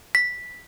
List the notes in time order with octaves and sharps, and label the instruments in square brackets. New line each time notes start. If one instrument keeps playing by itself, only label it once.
[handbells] B6